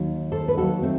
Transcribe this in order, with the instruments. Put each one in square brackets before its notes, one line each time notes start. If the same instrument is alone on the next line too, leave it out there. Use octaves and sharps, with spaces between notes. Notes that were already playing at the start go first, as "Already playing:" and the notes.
Already playing: [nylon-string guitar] D#2 D#3 F#3
A4 C5
B4
D#2 D#3 F#3 F#4 A4
A3 C4